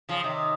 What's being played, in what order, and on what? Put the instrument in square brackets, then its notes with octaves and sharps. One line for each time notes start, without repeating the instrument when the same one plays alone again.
[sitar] C#3 F3
C3 D#3